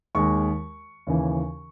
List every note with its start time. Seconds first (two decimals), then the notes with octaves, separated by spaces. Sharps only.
0.15 D#2 D#3 G#3 C#6
1.07 D#2 C#3 E3